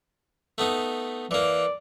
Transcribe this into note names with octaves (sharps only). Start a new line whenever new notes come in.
A3 B3 D#4
E3 A#3 D5